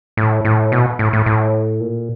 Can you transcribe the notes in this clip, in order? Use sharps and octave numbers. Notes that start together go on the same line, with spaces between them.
A2
A2
B2
A2
A2
A2
A#2